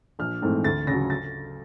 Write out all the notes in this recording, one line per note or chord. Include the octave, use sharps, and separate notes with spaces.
A#1 F6
G#2 E3 A3 C4
D2 A6
C#3 F#3 A#6
A6